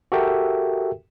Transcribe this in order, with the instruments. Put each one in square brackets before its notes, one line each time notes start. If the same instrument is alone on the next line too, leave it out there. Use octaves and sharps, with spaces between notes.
[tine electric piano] F#4 G4 A4 A#4 E5 G5